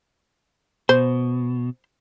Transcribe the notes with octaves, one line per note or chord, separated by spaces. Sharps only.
B2 C5